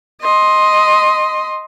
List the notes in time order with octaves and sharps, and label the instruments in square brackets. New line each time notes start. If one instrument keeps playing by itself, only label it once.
[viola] D#5 C6